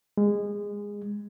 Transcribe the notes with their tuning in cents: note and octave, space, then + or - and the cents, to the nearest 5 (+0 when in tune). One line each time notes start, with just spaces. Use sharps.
G#3 -20